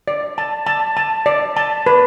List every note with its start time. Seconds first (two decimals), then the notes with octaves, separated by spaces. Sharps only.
0.08 D5
0.38 A5
0.66 A5
0.97 A5
1.26 D5
1.57 A5
1.86 B4